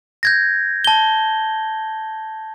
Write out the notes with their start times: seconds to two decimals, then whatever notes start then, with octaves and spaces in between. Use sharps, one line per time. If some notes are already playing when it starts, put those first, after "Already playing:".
0.23 G6 G#6 A#6
0.85 A5 G7